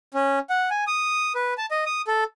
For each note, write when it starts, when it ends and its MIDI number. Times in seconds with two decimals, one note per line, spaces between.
0.14 0.39 61
0.50 0.70 78
0.70 0.84 80
0.87 1.33 87
1.35 1.54 71
1.58 1.66 81
1.71 1.84 75
1.86 2.02 87
2.07 2.24 69